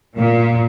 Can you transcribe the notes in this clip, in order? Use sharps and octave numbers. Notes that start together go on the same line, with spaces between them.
A#2